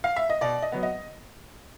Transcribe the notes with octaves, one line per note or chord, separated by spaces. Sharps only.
F5
E5
D#5
B2 D5
D#5
F#3 B3
D#5